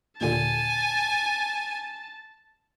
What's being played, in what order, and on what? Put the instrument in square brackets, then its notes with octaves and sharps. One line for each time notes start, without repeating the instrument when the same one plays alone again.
[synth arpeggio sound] D#2 A#2 D3 [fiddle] G#5 [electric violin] A5